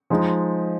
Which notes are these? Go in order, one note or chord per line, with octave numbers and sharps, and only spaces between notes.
F3 G#3 D#4